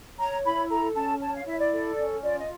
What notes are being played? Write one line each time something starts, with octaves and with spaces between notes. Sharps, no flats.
C#5 A#5
E4 B5
A4 A#5
C#4 A5
C#5 A5
F5
E4 E5
D5
A4
C#4
F4 D5
D#5